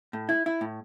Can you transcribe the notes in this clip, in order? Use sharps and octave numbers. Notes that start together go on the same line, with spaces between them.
A2
E4
E4
A2